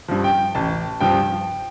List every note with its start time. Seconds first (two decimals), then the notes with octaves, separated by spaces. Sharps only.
0.08 G2 F3
0.24 G5
0.55 A1 A5
1.00 G2 F3 G5